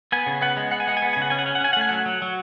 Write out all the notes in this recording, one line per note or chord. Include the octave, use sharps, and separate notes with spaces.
B3 G#5
C#3
B3 F#5
G#3
B3 F#5
G#5
G#3 F#5
G#5
B3 F#5
C#3 G#5
F#5
C#4 G#5
F#5
C#4 G#5
F#5
C#4 G#5
F#5
A3 G#5
F#3 F#5
F#3
F#3